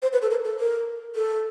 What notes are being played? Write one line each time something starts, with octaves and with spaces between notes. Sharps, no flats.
C5
B4
A4
A#4
A4
A#4
A4